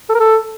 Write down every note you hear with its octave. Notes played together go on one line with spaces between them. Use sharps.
A4
A#4
A4